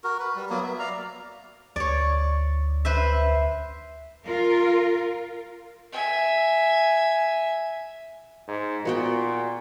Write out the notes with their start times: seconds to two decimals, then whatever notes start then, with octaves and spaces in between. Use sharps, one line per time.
0.04 F#4 A#4
0.20 B4
0.35 G3
0.50 F#3 A#3 B3
0.63 E5
0.79 D5 F5 A#5
1.76 D2 C#5 D5
2.85 B4 C5 E5
4.26 F4 A#4
5.92 E5 G#5
8.48 G#2
8.85 A#2 B3 F#4 G5